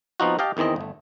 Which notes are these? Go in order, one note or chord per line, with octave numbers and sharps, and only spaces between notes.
F3 B3 C4 D#4 F4 F#4
G4 D#5 F5 G5 A5
E2 D#3 E3 C4 D#5
G1 A3